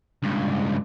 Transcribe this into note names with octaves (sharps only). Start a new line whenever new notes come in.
C#2 G2